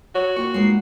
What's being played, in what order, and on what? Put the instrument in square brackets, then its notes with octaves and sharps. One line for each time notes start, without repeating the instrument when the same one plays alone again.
[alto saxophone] F#4 [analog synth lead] C#5
[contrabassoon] A#2 [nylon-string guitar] F4 G5 [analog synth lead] C#6
[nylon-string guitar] G#3 B3 D#4 [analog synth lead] C7